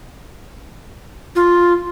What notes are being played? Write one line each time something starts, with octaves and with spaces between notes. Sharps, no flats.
F4